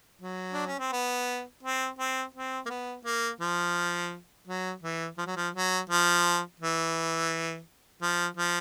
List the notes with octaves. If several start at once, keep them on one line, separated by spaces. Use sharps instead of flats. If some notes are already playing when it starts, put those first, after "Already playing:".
F#3
D4
C#4
C4
B3
C4
C4
C4
A#3
B3
A#3
F3
F#3
E3
F3
F#3
F3
F#3
F3
E3
F3
F3